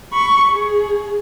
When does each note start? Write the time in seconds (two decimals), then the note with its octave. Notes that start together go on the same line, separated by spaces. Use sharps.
0.12 B5 C#6
0.51 G#4